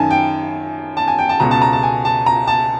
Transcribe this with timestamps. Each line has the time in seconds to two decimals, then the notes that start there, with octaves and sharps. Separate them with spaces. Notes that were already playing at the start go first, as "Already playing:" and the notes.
Already playing: F#2 D#3 G#5 A5
0.11 G5
0.97 A5
1.08 G#5
1.19 G5
1.29 A5
1.40 C#2 B2 A#5
1.51 A5
1.62 A#5
1.73 A5
1.83 G#5
2.05 A5
2.26 A#5
2.47 A5